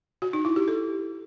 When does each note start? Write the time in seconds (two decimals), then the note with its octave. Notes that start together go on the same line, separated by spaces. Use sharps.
0.22 F#4
0.33 D#4
0.45 E4
0.56 G4
0.68 A4